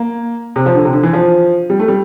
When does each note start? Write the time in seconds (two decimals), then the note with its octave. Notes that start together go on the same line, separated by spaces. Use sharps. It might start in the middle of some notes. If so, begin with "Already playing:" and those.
Already playing: A#3
0.56 C3
0.66 F3
0.75 D3
0.85 C3
0.93 D3
1.03 E3
1.13 F3
1.70 G3
1.79 A3
1.88 G3